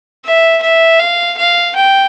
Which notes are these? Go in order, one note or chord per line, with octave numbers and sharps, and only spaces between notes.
E5
E5
F5
F5
G5